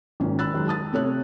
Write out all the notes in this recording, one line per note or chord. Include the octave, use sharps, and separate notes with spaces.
G#1 A#2 D#3 C#4
B5 E6 F#6 A6
D#3 F#3 G#3
A5 D#6 A6
C3 A3 C#5 F#6